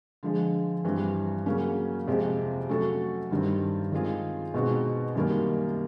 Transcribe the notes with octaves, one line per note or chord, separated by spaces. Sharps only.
D3 F3 G#3
G2 E3 G3 C4
C#3 F#3 A#3 C#4
F2 C3 F3 G#3 C4
F#3 A3 C#4 F#4 A4
G2 D#3 G3 C4
D#3 G#3 C4 F4 G#4
B2 G#3 C4 D#4 F#4
F#2 D#3 G3 A#3